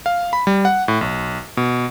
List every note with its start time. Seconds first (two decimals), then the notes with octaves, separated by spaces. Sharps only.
0.06 F5
0.33 B5
0.47 G3
0.65 F#5
0.88 A2
1.01 B1
1.57 B2